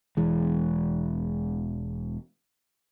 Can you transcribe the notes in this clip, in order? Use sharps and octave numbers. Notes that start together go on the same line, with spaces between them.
E1 E3 G#3